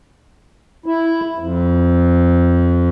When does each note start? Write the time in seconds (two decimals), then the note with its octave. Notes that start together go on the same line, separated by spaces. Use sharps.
0.86 E4
1.39 F2